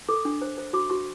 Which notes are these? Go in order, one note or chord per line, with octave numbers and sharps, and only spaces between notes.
A4 D6
D4
C5
C5
F#4 D6
F#4 C#6